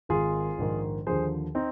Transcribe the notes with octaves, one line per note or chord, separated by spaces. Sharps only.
G#1 G#2 D#3 F4 G#4
A#1 G#2 D#3
D#2 D3 F3 G#4 C5
C4 D#4